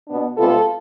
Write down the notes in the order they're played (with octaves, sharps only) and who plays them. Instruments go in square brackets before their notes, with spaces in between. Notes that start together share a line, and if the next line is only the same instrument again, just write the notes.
[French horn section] B2 B3 D4
D2 C3 G#3 B3 F4 A4